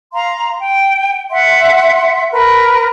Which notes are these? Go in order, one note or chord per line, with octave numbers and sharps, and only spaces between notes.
F5 A#5 C6
G5
E5 F#5 C6
A#4 B4